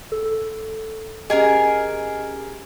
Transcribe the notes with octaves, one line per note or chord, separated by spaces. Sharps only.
A4
C#4 G4 G#4 A#4 D#5 G#5